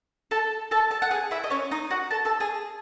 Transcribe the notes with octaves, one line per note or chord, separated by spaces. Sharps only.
A4 A5
A4 A5
A4 A5
F#5
G#4 G#5
E4 E5
D#5
C#4 C#5
D#4 D#5
F#4 F#5
A4 A5
A4 A5
G#4 G#5